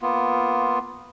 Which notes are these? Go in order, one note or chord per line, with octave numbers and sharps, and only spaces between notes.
A#3 B3 F4